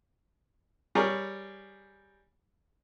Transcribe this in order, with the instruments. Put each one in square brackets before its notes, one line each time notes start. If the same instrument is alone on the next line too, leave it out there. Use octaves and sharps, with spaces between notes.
[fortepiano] G3 G#4 A#4 C#5